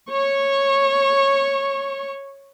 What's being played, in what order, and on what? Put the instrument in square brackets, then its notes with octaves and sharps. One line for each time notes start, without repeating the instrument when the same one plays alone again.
[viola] C#5 C#6